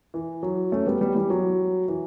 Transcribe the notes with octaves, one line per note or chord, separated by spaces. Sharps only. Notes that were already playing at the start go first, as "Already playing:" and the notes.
E3
F#3
A3 C#4
G3 B3
G3 B3
E3 G3
F#3
E3